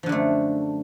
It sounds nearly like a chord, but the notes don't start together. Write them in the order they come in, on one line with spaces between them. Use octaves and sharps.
F3 D3 F#2 A3